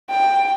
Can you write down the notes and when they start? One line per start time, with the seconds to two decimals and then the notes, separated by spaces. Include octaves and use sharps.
0.10 G5